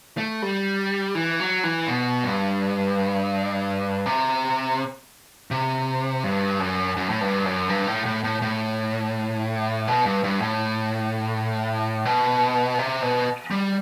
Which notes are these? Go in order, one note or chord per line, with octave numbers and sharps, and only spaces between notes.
A3
G3
E3
F#3
E3
B2
G2
C3
C3
G2
F#2
F#2
A2
G2
F#2
G2
A2
A2
A2
A2
B2
G2
G2
A2
B2
C3
B2
G3